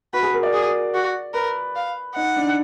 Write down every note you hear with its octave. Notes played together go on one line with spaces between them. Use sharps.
F#4 B4
G#4
A#4
D5
G#4
F#4
A#4 B4
F5
D#4 F#5
D4